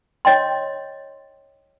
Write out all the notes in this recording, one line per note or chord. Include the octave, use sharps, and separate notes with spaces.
C#5 D#5 G5 C6